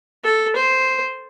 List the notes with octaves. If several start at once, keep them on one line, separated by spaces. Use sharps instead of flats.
A4
C5